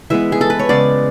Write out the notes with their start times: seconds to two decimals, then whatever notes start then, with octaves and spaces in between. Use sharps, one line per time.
0.10 E3 G#3 B3 E5
0.32 G#4
0.41 A4
0.50 B4
0.59 C#5
0.69 C#3 G#3 B3 D5